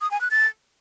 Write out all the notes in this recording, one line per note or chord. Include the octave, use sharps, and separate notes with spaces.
D#6
G#5
F#6
A6